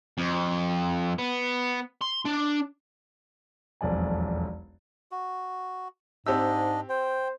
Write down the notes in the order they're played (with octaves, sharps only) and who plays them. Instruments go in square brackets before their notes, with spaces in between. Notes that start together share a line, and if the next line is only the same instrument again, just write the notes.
[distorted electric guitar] F2
B3
C6
D4
[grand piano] E1 B1 F2 D5 G#5
[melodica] F#4
[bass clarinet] G#2 [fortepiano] C4 G4 E6 [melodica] D4 D#5
[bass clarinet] C5 [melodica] G5